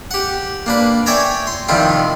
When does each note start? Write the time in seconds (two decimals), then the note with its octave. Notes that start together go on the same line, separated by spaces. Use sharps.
0.11 G4 F#5
0.66 A#3 D4 B4
1.06 C#5 D5 E5 G5 G#5 A#5
1.47 C6
1.69 C3 D#3 F3 G3 E4 F4